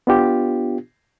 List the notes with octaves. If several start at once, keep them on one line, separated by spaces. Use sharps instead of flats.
B3 D4 F4 G4